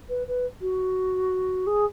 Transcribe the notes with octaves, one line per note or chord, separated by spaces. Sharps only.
B4
B4
F#4
G#4